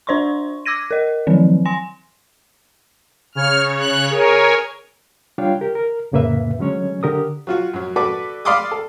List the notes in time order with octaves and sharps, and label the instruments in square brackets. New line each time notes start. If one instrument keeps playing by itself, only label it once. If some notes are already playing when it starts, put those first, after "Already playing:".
[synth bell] D4 C5 D5 C6 C#6
D6 E6 G#6 A#6 D#7
A#4 D#5
D#3 F3 F#3 C4
G#5 C6 A#6
[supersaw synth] C#3 C#5 [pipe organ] F6
[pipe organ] F#6
[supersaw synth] G#4 G#5 [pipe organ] A#4 C#5
[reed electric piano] G3 D4 F4 C#5 F5 G5
G4 A#4
A#4
F2 A2 C#3 A#3 B4 E5
D3 F#3 G#3 C#4 C#5
D3 G4 A#4 D#6
[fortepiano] F#3 F4 F#4
F#2 F#3
F#4 A4 B4 D5 D6
D5 F5 B5 C6 D6 D#6
A4